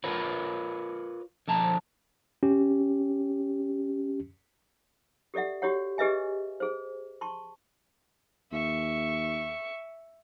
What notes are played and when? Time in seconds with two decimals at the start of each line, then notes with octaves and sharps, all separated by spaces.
0.04 F4 A#4 B4 C#5
1.48 D3 F3 A5 A#5
2.43 C#4 G4
5.34 G4 A4 D5 E5 F#5
5.62 F#4 G4 C#5 F#5
5.98 G4 G#4 B4 D#5 E5 G#5
6.60 G#4 C5
7.21 A5 C6 C#6
8.52 D#2 E5 C#6